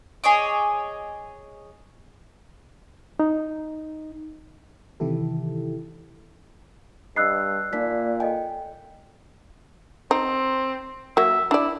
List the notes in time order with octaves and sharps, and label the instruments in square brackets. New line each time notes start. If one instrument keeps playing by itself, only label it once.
[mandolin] G#4 C#5 D#5 D6
[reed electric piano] D#4
[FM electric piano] C3 D#3 E3 E4 G4 A4
[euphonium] G2 [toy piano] D#5 B5 D#6 [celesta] E6 F#6 C7
[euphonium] A#2 [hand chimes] A#3 D5 B6 [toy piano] D#4
[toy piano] A4 D#5 G#5 [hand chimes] G5
[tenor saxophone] C4 [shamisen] D#4
[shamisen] F#3 A#3 [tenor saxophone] E5
[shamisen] D4 D5 [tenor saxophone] E4